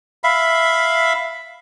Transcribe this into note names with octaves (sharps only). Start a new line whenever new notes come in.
E5 F5 B5